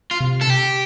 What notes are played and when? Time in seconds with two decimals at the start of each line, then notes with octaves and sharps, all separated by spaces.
0.11 F4
0.20 C3
0.41 A4
0.50 G4